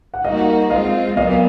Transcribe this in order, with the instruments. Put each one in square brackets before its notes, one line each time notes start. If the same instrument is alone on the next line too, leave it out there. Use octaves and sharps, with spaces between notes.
[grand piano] F#5
[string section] G3 A#3 D#4 F#4 [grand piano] D#5 F5
[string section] G#3 C4 F4 [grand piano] D#5 F5
[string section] A#2 F#3 B3 [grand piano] D#5 F5